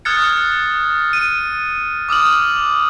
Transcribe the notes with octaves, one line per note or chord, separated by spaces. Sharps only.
D#6 F6 F#6 G#6 A6 C#7
D#7
D6 D#6 F6 F#7